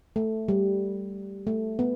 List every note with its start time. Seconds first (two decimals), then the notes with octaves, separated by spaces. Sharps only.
0.16 A3
0.48 G3
1.47 A3
1.79 B3